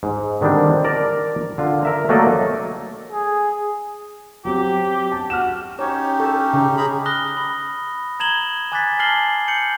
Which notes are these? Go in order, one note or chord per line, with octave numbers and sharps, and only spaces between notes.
G#2
D3 D#3 G3 C4 D4
A#4 D5 A5 A#5
D3 F4
A#4 E5 A#5
F#3 A3 A#3 A4 D5 D#5
G#4
F#3 C4 G4
A5
F#4 F6 E7
C#4 D#4 G4 C#5
A4
C#3
G#4 A#5 B5
B5 D#6 F6 F#6 A#6 G7
B5
A#5 G#6 E7 F#7 G7
G#5 D6 F#6 G#6 A6 B6
A5 F6 C7 F#7 G7
G6 C#7 F#7